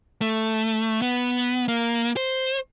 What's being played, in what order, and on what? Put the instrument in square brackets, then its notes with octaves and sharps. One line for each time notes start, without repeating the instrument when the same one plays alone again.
[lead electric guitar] A3
B3
A#3
C5